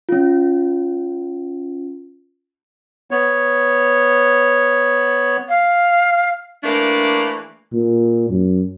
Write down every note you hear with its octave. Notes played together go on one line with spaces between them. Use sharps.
C#4 F4
B3 C#5
F5
E3 A3 A#3 D4
A#2
F#2